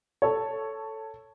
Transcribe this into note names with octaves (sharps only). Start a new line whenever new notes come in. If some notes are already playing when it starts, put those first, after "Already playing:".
A4 C#5